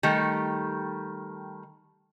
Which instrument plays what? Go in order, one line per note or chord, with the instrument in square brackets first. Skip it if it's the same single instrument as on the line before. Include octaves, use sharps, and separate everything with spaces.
[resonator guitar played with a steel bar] D#3 G3 A3